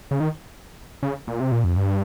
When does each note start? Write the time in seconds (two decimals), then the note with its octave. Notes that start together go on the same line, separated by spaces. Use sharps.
0.11 C#3
0.20 D#3
1.03 C#3
1.28 A#2
1.40 C3
1.52 A#2
1.64 F2
1.77 G2